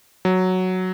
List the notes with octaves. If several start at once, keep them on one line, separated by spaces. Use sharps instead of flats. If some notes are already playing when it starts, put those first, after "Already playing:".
F#3